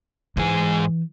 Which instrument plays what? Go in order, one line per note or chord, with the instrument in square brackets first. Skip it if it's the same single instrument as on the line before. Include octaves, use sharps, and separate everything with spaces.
[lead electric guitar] G#2 G#4 [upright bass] E3